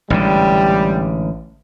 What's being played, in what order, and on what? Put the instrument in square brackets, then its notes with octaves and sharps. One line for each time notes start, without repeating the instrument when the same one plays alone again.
[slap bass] A1 G#2 D3 [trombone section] G3